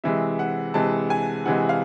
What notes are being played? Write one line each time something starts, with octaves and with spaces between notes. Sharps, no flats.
C3 E3 G#3 E5
F#5
C3 E3 G#3 A5
G#5
C3 E3 G#3 F#5
F5